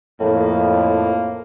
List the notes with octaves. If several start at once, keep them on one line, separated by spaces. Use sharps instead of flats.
F2 A2 A#3